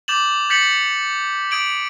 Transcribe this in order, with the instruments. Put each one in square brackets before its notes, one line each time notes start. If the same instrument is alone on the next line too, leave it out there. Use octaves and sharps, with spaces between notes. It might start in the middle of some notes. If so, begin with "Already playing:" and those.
[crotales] D6 G6 A6 E7 F#7
G6 A6 B6 C#7 F#7
D#6 G#6 D7 F#7